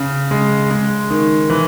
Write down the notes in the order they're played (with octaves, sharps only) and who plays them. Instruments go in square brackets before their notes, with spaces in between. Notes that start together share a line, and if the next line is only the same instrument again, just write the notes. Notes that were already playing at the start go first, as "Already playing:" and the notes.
Already playing: [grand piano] C#3
G#3
G#3
D#3
E3